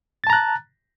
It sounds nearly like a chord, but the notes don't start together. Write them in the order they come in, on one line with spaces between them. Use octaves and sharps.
A6 A5 A#5 F#6